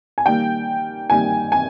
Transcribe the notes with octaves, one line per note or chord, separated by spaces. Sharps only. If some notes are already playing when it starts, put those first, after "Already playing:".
G#5
D#3 G3 A#3 G5
D#3 G3 A#3 G#5
G#5